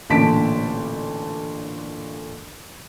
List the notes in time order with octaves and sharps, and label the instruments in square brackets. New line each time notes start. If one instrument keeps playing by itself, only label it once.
[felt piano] A1 A#2 D3 A5 B6 D7